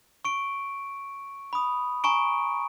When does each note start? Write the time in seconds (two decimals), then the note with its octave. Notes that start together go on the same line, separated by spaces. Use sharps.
0.25 C#6 D7
1.53 B5 D#6
2.04 G#5 A#5 C#6 D7